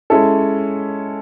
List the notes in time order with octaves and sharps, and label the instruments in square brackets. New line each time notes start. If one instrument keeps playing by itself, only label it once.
[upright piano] G#3 C#4 E4 A4